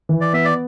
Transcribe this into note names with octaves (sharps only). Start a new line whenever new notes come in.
E3
D5
B3 E5
D5